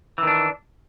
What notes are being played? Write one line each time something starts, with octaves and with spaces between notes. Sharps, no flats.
D#3 E3 D4